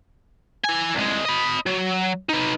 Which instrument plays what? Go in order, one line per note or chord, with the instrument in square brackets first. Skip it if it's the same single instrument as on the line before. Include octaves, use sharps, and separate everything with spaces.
[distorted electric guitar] E4 G#5
C2 G#3
D#5 B5
F#3
D#4 B4